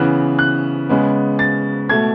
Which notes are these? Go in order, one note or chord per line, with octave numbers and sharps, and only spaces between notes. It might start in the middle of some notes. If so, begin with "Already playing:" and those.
Already playing: C#3 E3 B3 F#6
F#6
C#3 G#3 B3
A6
B2 A3 G#6